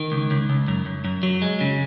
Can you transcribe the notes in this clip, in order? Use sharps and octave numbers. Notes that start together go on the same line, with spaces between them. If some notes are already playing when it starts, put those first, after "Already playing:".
Already playing: D#3
C#2
C#2
C#2
F#2
F#2
F#2
F#3
G#3
C#3